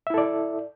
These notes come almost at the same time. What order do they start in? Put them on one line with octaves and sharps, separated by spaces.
E5 E4 A4 D5